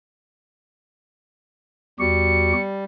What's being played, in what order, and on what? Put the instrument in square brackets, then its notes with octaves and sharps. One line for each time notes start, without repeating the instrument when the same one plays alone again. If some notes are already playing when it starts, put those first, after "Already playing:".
[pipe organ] E2 F#4 G4 [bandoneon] G3 [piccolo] C#7